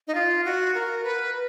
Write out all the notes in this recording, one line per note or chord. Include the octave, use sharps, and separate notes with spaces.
D#4
F4
F#4
A#4
B4